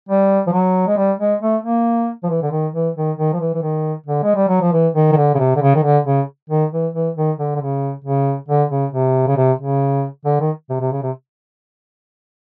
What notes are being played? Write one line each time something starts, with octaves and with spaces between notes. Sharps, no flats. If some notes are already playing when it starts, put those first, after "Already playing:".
G3
F3
F#3
G#3
G3
G#3
A3
A#3
F3
E3
D3
D#3
E3
D#3
D#3
F3
E3
E3
D#3
D3
G#3
G3
F#3
F3
E3
D#3
D#3
D3
C#3
C3
D3
C#3
D#3
D3
C#3
D#3
E3
E3
D#3
D3
D3
C#3
C#3
D3
C#3
C3
C#3
C3
C#3
D3
D#3
C3
C3
C#3
C3